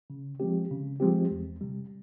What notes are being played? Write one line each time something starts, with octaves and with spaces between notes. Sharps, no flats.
C#3
F3 G#3 C4 G4
C#3
F3 G#3 C4 G4
E2
C3 G3